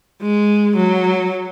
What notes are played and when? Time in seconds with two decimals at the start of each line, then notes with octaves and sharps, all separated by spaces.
0.21 G#3
0.76 F#3